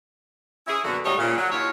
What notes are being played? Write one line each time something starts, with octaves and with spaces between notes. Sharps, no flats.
C#4 E4 G#4
F#2 B2 D3 A#3 F#4
D2 G#2 G3 A3 C#5 D#5
A#2 C#3
F#3
D#2 E4 F4 C#5